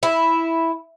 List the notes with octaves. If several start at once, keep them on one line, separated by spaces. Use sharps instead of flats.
E4